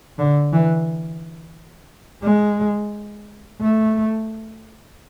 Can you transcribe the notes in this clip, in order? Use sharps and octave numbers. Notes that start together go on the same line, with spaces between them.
D3
E3
G#3
A3